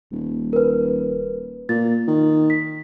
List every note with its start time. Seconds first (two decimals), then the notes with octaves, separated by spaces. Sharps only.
0.12 D#1
0.53 A#4 B4
1.69 A#2 A6
2.08 D#3
2.50 B6